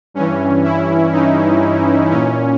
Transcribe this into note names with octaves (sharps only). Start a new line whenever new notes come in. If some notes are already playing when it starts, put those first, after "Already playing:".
G2 E3 C#4
E4
D#4
A#2 C#4